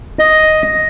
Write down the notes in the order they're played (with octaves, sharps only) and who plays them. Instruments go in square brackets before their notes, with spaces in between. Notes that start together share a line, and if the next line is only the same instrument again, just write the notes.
[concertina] D#5